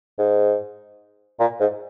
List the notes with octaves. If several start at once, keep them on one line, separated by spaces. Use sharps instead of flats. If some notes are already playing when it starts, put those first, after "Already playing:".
G#2
A#2
G#2